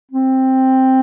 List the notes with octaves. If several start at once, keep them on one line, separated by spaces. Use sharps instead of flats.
C4